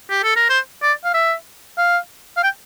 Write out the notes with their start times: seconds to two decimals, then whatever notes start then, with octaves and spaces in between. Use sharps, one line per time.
0.10 G4
0.23 A4
0.36 A#4
0.49 C5
0.83 D5
1.04 F5
1.14 E5
1.78 F5
2.37 F5
2.44 G5